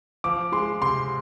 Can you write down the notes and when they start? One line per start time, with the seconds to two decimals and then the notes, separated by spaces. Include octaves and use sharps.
0.24 F3 D6
0.52 G#3 C6
0.81 C3 C6